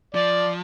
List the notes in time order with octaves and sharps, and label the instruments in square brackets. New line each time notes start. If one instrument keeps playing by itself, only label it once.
[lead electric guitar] F3 [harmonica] D5